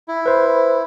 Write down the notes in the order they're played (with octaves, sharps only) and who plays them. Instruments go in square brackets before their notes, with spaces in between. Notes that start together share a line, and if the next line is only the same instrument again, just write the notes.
[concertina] E4
[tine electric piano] B4 C5